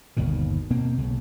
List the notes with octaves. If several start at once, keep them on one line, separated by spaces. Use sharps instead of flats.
G1 D#2 B2 D#3
B2 A#3 C4
B1 C#3